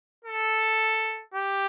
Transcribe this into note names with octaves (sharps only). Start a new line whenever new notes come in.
A4
G4